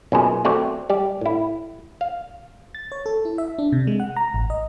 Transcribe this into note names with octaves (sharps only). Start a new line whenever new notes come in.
B1 F#2 A#2 G#4
A3 C4 F#4 D5 F#5
G3 G4 D5
A2 E4
F5
A6
C#5
A4
E4
E5
D4
C3
G#3
F#5
A#5
A1
D#5